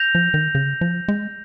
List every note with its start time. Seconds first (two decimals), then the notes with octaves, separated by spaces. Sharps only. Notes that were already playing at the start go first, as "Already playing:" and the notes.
Already playing: G6 A#6 F7
0.15 F3
0.34 D#3
0.55 C#3
0.81 F3
1.08 G#3